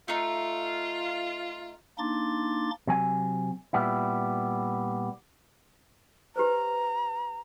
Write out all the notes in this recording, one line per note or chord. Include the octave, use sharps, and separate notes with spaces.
A3 D#4 F4
A#3 D4 D#4 C6 D6 A6
C3 F#3 G#5
A#2 G3 B3 E4
G4 B4 C5 A#5